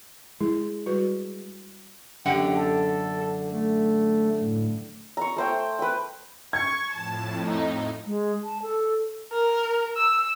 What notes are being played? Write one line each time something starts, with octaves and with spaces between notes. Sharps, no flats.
G#3 E4
G3 F#4 B4
F#2 D3 G4 F#5
A4
A3
A2
A#5 C#6
A3 C5 G5
B4 G5
C#6 G#6
F2 A2 A5
D#4
G#3
A5
A4
A#4
E6